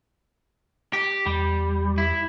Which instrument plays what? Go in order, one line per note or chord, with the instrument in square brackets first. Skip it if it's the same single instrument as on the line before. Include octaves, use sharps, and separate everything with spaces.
[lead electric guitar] G4
[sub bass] E2 [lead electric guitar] G3
[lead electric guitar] E4